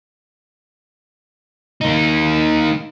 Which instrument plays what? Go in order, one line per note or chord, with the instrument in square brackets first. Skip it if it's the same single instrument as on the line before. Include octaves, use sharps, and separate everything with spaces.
[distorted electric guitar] A#3 D#4